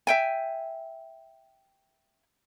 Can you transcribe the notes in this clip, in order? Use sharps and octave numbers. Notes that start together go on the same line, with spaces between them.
E5 G5 G#5